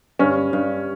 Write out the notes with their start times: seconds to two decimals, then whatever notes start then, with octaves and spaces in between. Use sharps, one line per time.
0.19 G2 C#4
0.53 G2